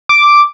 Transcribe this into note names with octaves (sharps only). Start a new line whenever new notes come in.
D6